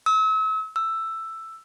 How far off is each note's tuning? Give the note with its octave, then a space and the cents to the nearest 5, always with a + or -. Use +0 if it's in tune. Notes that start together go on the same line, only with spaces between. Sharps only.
E6 -40
E6 +5